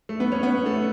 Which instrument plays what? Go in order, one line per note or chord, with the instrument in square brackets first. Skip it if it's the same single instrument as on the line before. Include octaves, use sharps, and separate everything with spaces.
[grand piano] A3
B3
C#4
B3
A3